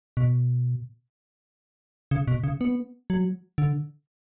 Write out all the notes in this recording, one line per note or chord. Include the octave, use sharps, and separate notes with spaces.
B2
C#3
B2
C#3
B3
F#3
D3